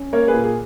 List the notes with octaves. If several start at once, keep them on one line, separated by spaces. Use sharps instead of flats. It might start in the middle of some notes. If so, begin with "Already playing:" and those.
Already playing: C#4
A#3 A#4 C#5
G#4 B4
A#2
G#4